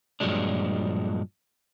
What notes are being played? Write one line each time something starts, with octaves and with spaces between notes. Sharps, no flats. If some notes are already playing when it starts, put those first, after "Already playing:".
G2 A#2 F3 F#3 G#3 D4